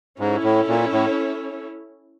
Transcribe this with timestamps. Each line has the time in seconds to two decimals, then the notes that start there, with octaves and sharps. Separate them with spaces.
0.19 G#2 C#4 E4 A4 C#5
0.44 A2
0.68 A#2
0.93 A2